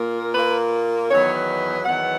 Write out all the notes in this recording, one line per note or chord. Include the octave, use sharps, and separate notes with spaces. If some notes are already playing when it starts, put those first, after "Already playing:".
Already playing: A#2 A#3
A#2 A#3 B4
E2 D#3 F#3 B3 C#5
E2 D#3 F#3 B3 F#5